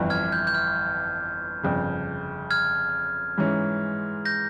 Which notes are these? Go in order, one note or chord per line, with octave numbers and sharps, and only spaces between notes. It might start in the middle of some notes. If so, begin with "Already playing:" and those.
Already playing: G1 F2 E3
F6 G#6
G6
G6
F6
G1 F2 C#3
F6 G#6
G#2 E3 G#3 C#4
G6 A#6